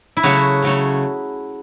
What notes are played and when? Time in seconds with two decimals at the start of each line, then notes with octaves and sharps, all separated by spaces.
0.17 E4
0.23 C#3 F#3 A3 C#4 F#4
0.62 C#3 F#3 A3 C#4